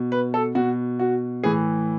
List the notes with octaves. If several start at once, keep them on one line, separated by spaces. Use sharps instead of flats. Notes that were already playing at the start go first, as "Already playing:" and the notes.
Already playing: B2
B4
A4
B2 F#4
F#4
A2 E3 G#4